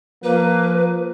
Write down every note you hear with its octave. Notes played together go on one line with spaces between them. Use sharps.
F3 A#3 B4